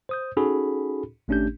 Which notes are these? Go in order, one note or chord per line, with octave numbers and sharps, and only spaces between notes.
C5 D#6 G6
C#4 D#4 F#4 G#4 A4 B5
G#1 A3 C#4 D4 G4 G6